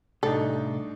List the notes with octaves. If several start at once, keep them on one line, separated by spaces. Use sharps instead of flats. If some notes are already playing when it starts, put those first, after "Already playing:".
C2 A2 D4 D#4 A4